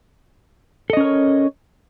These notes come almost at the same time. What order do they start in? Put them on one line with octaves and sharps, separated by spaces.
A4 D#5 C#4 A#4 C#5